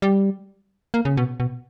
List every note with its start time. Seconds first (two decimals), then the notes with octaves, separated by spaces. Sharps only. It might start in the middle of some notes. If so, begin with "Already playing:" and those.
0.02 G3
0.94 A#3
1.05 C#3
1.17 B2
1.40 B2